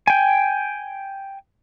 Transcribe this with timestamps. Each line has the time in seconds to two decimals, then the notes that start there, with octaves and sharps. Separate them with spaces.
0.07 G5 G#5